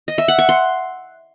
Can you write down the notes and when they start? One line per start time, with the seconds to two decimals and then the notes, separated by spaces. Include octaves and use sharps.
0.08 D#5
0.18 E5
0.28 F#5
0.39 C#6
0.49 C6